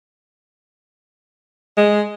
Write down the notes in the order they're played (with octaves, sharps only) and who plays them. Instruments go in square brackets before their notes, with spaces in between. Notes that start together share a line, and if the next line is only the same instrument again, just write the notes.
[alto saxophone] G#3